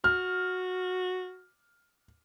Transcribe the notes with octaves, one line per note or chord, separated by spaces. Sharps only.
F#4 F6